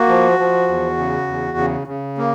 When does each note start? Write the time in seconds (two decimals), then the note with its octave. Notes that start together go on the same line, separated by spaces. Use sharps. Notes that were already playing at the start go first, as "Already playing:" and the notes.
Already playing: A#3 F#4
0.08 F3
0.39 F3
0.68 E2
0.98 C#3
1.27 E2
1.58 C#3
1.87 C#3
2.18 A#3